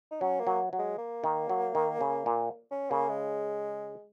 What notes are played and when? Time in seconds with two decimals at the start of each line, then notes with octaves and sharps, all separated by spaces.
0.11 D#4
0.21 F#3 C#4
0.40 A#3
0.47 F#3
0.73 F#3
0.78 G#3
0.98 A#3
1.24 D#3
1.49 F#3
1.75 D#3
2.01 C#3
2.26 A#2
2.71 C#4
2.91 C#3 A#3
3.09 G#3